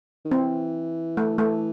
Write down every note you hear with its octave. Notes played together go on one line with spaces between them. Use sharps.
D#3
E3 C4
A3
A3